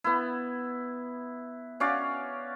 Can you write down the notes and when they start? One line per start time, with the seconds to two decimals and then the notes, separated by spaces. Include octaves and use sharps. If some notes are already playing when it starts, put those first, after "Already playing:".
0.04 B3 E4
1.80 C#4 F#4 D5 F5